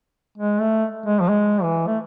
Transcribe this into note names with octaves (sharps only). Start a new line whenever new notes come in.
G#3
A3
G#3
F3
G#3
E3
A3